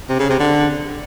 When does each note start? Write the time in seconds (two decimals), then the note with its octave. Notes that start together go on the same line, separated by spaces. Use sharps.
0.09 C3
0.19 C#3
0.29 C3
0.40 D3